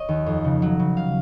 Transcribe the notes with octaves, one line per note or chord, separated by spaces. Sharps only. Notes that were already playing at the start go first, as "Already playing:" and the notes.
Already playing: C#5 D#5
D#2
F2
C#3
F#3
C#3
F5